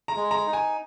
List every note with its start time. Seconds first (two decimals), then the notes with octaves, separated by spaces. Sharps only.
0.08 A#5
0.16 G#3
0.31 A#5
0.46 D#4
0.53 G#5